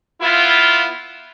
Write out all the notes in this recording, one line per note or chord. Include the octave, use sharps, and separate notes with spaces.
B3 E4 F4